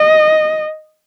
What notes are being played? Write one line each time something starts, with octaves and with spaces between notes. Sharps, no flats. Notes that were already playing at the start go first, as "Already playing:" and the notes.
Already playing: D#5